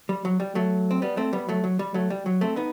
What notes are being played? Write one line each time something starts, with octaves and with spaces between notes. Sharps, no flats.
G3
F#3
G3
F#3 A3
C4
G3 B3
A3 C4
G3 B3
F#3 A3
F#3
G3
F#3 A3
G3
F#3
A3 C4
B3 D#4